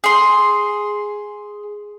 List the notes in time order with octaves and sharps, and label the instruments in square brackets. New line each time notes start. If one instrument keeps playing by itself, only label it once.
[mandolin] G#4 C6